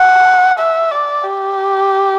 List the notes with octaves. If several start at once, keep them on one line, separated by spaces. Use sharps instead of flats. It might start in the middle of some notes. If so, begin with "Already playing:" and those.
Already playing: F#5
E5
D5
G4